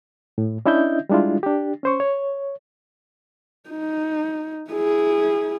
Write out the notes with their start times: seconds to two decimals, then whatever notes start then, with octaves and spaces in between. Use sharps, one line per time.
0.38 A2
0.66 C#4 D4 E4 D#5 E5 G6
1.09 G3 G#3 D4 E4 F4
1.43 D4 G4
1.83 C#4 C5 C#6
2.00 C#5
3.70 D#4
4.71 E4 G#4